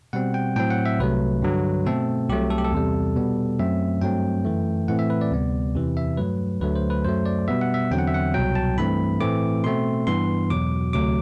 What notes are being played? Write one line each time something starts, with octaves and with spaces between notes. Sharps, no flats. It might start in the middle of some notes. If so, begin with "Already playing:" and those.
B2 G3 C4 F#5
G5
A2 F#3 C4 G5
F#5
E5
C2 C3 F#3 A3 B4
G2 D3 F#3
B2 A3 C4 A4
C2 C3 F#3 A3 G4
A4
G4
A4
E2 C3 G3
B2 G3 B3
F#2 F#3 A3 C4 E5
G2 F#3 A3 C4 G5
F#2 E3 A3
A2 E3 A3 C4 F#5
E5
B4
D5
D2 C3 G3 B3
E2 C3 E3
E5
G2 F#3 A3 B4
D2 D3 F#3 A3 B4
C5
B4
F#2 F#3 A3 C5
D5
B2 G3 B3 E5
F#5
E5
E2 D3 F#3 C4 G5
F#5
E5
F#5
C2 B2 F#3 G5
A5
G2 E3 A3 C4 B5
A2 E3 A3 C4 D6
B2 A3 C4 C6
G2 E3 B3 C6
E2 B2 F#3 D6
D2 C3 F#3 A3 D6